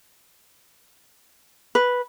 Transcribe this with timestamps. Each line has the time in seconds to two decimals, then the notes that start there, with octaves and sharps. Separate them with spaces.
1.75 B4